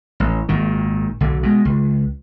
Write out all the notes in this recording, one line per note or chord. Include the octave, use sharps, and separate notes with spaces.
A1
G#1 A#2 D#3
B1 D3
B2 G#3
C#2